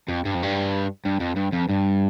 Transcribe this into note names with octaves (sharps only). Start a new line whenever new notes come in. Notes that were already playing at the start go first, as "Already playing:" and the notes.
F2
G2
F2
G2
G2
F2
G2
F2
G2